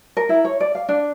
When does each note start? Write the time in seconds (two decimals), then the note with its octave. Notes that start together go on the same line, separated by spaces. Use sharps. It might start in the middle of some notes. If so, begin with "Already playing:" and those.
0.17 A#4
0.29 E4
0.44 C#5
0.60 D5
0.75 F5
0.89 D4